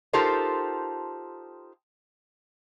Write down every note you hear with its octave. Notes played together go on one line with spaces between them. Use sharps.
D#4 F4 G4 A4 A#4 C5